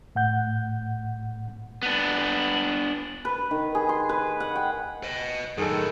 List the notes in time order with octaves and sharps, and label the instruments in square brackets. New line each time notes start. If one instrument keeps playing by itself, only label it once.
[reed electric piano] A2 F#5 G6
[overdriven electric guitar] B3 D4
[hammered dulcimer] B4
D#3
G#4
C6
B4
F#5
G5
[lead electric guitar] B4 D#5
[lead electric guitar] F#2 A2 [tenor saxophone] D#3 [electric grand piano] G#4 A4